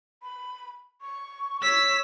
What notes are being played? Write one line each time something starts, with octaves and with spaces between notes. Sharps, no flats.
B5
C#6
C#5 E6 B6